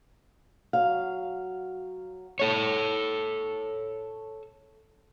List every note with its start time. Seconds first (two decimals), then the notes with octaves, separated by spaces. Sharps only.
0.73 F#3 F5
2.40 A4 C#5